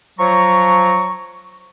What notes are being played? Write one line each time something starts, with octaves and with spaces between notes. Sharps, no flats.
F3 F#3 A#5 C#6